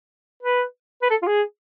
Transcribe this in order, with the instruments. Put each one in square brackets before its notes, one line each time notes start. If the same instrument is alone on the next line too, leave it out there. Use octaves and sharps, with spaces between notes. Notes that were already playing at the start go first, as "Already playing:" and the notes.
[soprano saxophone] B4
B4
A4
F4
G#4